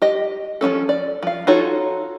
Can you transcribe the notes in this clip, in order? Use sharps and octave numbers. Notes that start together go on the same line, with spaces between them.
G4 D#5
F3 C4 C#4 A4
D5
F3 F5
D#4 F4 F#4 A4 C#5